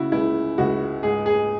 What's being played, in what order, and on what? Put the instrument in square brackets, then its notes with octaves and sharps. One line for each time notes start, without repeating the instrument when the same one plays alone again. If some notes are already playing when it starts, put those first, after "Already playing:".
Already playing: [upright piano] C#3 E4 F#4
C#2 E4
C#2 F#4
G#2 G#4
G#4